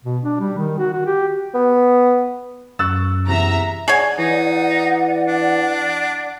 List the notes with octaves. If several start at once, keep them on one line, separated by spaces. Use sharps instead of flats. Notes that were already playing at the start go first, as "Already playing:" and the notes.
B2
D4
G3
D#3
F#4
F#4
G4
B3
F#2 C#6 E6 F#6 A6
E2 C3 E5 A#5
G#4 C#5 D5 F#5 G#5
E3 D#4
D4